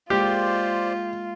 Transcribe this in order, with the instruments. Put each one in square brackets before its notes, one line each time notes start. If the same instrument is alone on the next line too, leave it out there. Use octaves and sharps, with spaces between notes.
[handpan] G#3 A#3 [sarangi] F4 [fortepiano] G4 [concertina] C5 D5